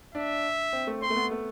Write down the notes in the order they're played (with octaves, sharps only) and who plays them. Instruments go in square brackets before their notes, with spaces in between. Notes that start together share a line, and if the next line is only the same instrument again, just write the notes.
[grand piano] D4 [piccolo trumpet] E5
[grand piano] C4
A3
[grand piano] C4 [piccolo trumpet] C6
[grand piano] A3
B3
A3